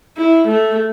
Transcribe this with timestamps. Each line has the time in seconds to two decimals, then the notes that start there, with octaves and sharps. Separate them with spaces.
0.17 E4
0.48 A3